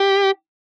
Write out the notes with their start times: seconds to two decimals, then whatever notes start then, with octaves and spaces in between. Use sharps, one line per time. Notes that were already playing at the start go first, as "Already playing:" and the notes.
Already playing: G4